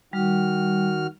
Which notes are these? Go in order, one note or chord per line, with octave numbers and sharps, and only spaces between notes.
D#3 G3 F#4 F6